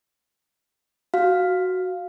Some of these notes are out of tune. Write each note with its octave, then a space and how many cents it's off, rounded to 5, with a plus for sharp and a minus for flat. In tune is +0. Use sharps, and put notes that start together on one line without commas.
F#4 +0 F5 +0